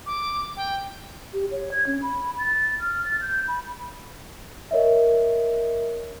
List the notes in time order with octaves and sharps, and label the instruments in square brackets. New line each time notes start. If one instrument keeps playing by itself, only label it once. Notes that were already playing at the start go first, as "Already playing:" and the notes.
[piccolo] D6
G5
[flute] G4
C#5
G#6
C#4
B5
A6
F6
A6
G6
B5
[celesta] A#4 C#5 D#5 E5